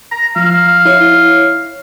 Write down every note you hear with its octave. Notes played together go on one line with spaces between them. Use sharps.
A#5
F3 F5
E4 C#5